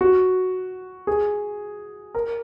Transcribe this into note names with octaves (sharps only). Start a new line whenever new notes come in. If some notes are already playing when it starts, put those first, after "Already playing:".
F#4
G#4
A#4